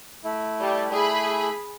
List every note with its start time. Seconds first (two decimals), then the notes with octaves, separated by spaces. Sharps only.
0.24 A3 E4
0.61 G3
0.94 G#4 B5